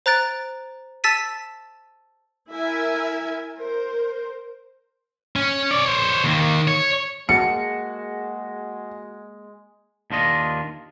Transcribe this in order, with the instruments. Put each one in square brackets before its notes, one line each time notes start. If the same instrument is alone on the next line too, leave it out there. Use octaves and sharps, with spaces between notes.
[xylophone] C5 A#5 F#6 A6 D7
A5 E6 A6 B6 D#7
[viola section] E4 A#4 E5 G#5
A#4 C5
[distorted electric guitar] C#4
C#5 D5
C5 C#5
D#2 D#3
C#5
[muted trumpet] G#3 [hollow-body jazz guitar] A#3 G#4 A5 [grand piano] F#4 [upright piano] C#7
[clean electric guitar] D#2 D4 F4 D#5